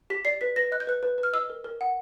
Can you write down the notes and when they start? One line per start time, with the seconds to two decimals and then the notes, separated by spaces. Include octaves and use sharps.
0.10 G4 B6
0.25 D5 C7
0.41 B4 B6
0.56 B4 A#6
0.72 D#5 F#6
0.80 G6
0.87 B4 F#6
1.03 B4
1.18 B4
1.23 F6
1.33 D#5 E6
1.50 A#4
1.64 A#4
1.81 F#5